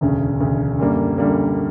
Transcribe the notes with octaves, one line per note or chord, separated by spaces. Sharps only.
E1 D2 C#3
E1 D2 C#3
F#2 D3 G3 A#3
F#2 D3 G3 A#3